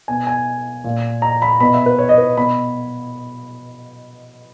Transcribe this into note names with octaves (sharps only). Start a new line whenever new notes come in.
B2 G#5
G#5
A#2
A#5
B5
B2 B5
E5
B4
C#5
D#5
B4
B2 B5